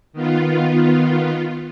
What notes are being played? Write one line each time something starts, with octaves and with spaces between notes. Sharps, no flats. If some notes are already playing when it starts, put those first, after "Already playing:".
D#3 B3 F4